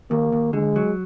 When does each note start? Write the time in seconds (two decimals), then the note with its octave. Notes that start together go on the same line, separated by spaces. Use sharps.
0.10 D#2 A#3
0.32 D#2
0.53 D3 G#3
0.76 F#3